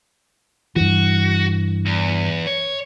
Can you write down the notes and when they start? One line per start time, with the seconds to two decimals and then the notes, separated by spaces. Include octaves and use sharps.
0.76 G2 E3 F#4
1.86 E2
2.47 C#5